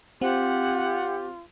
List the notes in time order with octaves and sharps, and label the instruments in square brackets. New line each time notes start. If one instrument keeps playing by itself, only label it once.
[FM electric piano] C4 [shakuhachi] F4 [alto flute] G4 [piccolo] F#5